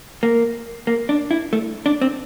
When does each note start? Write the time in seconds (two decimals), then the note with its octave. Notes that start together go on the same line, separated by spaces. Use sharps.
0.23 A#3
0.87 A#3
1.09 D4
1.31 E4
1.53 A3
1.86 D4
2.01 C4